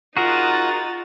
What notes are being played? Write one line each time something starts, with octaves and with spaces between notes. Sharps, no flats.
D#4 F4 F#4 G#4 A#4 F#5 A#5 A6